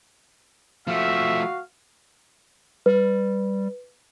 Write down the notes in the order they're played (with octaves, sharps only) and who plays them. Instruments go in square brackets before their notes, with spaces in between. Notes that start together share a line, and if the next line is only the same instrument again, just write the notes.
[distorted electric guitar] F3 A3 [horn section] F#4 F5 [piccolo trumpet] E5
[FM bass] G3 [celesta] B4